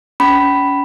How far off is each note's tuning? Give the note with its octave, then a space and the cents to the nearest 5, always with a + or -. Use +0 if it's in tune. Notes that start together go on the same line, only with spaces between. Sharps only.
C#4 +30 B5 +0